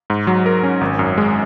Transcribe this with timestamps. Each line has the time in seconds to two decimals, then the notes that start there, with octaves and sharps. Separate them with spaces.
0.10 G#2
0.27 F#3
0.46 A#4
0.63 C#4
0.81 G#1
0.99 F#2
1.18 G#3